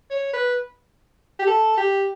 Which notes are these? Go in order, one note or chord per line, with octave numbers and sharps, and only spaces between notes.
C#5
B4
G4
A4
G4